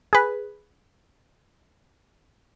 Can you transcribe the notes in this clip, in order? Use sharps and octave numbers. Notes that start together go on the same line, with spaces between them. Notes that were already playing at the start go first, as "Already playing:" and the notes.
G#4 B4